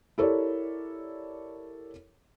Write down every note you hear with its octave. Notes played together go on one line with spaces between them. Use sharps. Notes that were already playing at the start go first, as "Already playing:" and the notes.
E4 G4 A4 A#4 C#5 D5